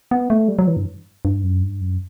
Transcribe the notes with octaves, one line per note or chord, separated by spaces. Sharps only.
B3
A3
G3
F#3
E3
G2
G2
F#2
G2
F#2